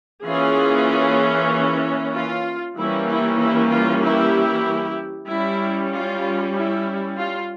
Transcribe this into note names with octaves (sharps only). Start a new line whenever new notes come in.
E3 A#3 C#4 F4 G#4
F4
E3 G3 A#3 C#4 E4
E4
E4
F4
E4 G4
G3 C#4 E4
F4
E4
F4